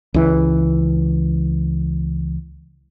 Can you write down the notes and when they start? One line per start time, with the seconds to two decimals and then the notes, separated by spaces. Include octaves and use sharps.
0.14 C#2 E3